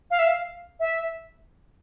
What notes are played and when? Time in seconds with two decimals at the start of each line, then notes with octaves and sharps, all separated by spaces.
0.11 F5
0.19 E5
0.27 F5
0.80 E5